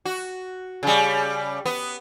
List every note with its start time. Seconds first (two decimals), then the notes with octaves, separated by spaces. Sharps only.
0.05 F#4
0.83 C#3 G3
1.66 B3